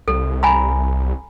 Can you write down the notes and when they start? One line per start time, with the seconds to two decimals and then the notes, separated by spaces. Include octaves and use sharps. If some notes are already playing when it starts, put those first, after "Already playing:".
0.08 C2 A4
0.43 G#5 A#5 B5